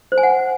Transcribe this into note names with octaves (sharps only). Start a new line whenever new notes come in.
C5
G#5
F#5